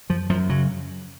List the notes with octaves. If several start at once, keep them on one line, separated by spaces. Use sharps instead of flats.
F#2 F3
F#2 F3
C#3 F#3